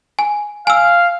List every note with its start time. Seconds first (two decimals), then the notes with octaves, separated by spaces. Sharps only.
0.19 G#5
0.67 F5 G#5 E6